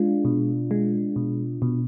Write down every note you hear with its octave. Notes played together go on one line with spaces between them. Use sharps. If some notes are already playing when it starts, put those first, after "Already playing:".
Already playing: G#3 D4 F4
B2
G#3
B2
B2